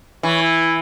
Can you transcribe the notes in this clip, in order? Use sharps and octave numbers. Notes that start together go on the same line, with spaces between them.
E3 C#5
E4